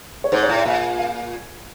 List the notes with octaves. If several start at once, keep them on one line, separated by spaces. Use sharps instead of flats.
C#5
G#2 C5
C#5
A2
D5
A#2 E5
F5